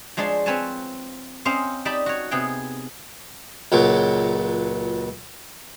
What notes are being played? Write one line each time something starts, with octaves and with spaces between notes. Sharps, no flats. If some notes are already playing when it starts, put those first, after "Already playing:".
F3 G#3 D4 C#5 A5 C6
C4 B4 C#5 G#5 A5
C4 C#4 A#4 C5 D#5 F5
D#4 G4 D5 G5 A5 B5
F#4 C#5
C3 B3 G#4 G5
C#2 A#2 F#3